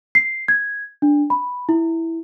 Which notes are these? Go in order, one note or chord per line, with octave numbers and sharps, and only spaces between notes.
C7
G#6
D4
B5
E4